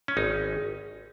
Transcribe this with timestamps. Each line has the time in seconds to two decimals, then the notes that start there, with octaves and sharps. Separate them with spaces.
0.08 C#4
0.17 G#1 D#4